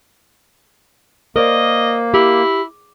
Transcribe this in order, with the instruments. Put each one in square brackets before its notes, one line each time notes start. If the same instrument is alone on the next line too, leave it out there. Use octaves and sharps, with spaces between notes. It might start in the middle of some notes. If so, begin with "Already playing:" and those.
[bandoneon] A#3 [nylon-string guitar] A#4 C5 D5 [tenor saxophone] D#5
[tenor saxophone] E4 [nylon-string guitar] G4